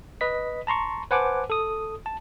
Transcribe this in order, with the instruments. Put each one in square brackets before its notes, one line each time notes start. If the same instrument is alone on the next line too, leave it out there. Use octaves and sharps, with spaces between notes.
[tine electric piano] B4 D#5 B6
A5 A#5 C6 C#6
B4 C5 F#5 G#5 A5 D6
A4 D#6
A5